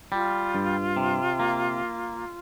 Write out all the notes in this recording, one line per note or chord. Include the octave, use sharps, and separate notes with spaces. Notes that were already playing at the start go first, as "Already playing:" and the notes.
G3 F4
G2
C3
A#3